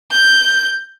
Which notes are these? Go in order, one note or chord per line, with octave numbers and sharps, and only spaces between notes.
G6